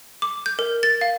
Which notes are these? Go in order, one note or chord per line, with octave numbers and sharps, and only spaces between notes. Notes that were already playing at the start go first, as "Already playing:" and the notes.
D6
G6
A#4
A6
F5